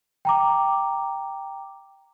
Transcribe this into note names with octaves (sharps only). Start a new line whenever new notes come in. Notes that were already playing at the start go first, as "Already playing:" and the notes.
G5 A#5 D6